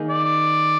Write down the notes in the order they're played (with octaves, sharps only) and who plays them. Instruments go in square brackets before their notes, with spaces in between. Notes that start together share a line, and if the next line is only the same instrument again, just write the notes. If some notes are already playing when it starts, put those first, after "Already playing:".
Already playing: [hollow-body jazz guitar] D#3 A#3 D#4 G#4
[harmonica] D5